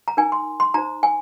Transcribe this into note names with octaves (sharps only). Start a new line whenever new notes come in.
A#5
D#4 A#4 G#5
C6
C6
D#4 C5 A#5
G#5